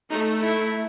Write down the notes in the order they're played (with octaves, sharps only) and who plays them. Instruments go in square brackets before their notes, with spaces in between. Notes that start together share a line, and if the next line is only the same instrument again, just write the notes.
[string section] A3 [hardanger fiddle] D#4
[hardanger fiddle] E4